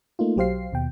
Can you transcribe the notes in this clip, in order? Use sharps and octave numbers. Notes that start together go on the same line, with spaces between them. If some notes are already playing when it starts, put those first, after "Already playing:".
A3 A#3 D#4 F4
B1 F#3 G4 C5 F5 C7
D#2 B2 G5